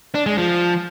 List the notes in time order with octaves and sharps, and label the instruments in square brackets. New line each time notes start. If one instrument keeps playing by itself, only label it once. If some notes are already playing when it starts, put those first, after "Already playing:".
[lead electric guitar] D4
G#3
F3